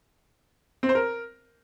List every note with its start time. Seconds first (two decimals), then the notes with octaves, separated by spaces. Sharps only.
0.83 C4
0.89 C5
0.95 A#4